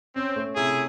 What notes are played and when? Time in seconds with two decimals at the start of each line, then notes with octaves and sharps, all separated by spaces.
0.16 C4 C#4
0.36 A3
0.55 C3 E4 G#4